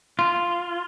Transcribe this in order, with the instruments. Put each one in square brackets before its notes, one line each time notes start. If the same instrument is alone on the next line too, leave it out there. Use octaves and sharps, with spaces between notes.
[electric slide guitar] F4